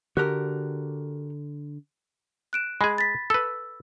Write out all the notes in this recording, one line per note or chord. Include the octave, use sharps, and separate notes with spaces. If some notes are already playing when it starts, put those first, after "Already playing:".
D3 F#4 G4 A#4
F#6 D7 E7
G#3 G#4 B5
A6 B6
A4 B4 E6